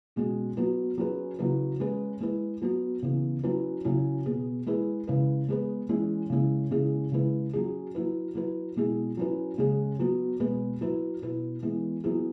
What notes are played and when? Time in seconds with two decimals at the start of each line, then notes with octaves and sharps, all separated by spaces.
0.16 B2 G#3 C#4 F#4
0.57 F#3 B3 F#4 B4
0.98 F#3 C#4 G#4 B4
1.39 C#3 F#3 E4 B4
1.80 G#3 C#4 G#4 B4
2.20 G#3 E4 G#4 B4
2.62 F#3 B3 F#4
3.02 C#3 E3 B3
3.43 F#3 C#4 E4 B4
3.85 C#3 F#3 C#4 E4
4.26 B2 B3 G#4
4.66 G#3 E4 G#4 B4
5.07 C#3 G#3 E4 B4
5.49 G#3 B3 G#4 B4
5.89 E3 G#3 C#4 E4
6.30 C#3 G#3 C#4 E4
6.71 C#3 G#3 C#4 E4 G#4
7.12 C#3 G#3 E4 B4
7.53 F#3 C#4 G#4
7.95 F#3 E4 B4
8.35 F#3 E4 B4
8.76 B2 G#3 E4 G#4
9.17 F#3 C#4 E4 B4
9.58 C#3 G#3 C#4 G#4
9.99 F#3 B3 F#4
10.40 B2 G#3 B3 G#4 B4
10.81 F#3 E4 B4
11.22 B2 B3 E4 B4
11.63 E3 G#3 B3
12.04 F#3 B3 E4 G#4